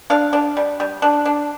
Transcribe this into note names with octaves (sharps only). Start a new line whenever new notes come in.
D4 F5
D4
G3
G3
D4
D4